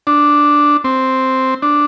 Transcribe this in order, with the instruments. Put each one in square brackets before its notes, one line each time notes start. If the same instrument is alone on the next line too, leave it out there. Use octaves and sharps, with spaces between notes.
[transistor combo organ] D4
C4
D4